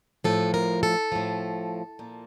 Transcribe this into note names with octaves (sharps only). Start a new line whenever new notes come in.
A2 F3 A4
A#4
A4
A2 F3
A#2 F3